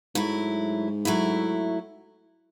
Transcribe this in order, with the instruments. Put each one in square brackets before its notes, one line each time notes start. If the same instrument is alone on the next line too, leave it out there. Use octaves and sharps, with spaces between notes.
[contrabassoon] G#2 [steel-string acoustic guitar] F#3 A3 E4
[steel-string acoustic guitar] F#3 A3 E4